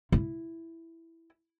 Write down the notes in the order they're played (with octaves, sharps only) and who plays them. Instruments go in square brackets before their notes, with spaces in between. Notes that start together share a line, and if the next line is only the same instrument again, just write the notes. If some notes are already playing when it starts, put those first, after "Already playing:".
[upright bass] E4